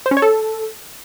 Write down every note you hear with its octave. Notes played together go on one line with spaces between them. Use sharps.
C5
C#4
C#5
A4